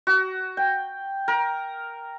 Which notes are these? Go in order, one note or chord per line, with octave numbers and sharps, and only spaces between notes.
F#4
G5
A#4